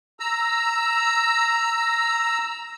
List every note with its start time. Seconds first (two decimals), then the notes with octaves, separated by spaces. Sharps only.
0.20 A#5 E6